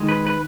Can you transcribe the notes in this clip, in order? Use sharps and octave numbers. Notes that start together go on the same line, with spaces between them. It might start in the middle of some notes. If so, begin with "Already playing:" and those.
Already playing: D#3 G#3
B4
B4